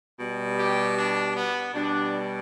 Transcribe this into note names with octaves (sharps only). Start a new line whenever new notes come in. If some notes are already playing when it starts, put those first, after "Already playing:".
B2 G3
G4
D4
B3
B2 G3 D4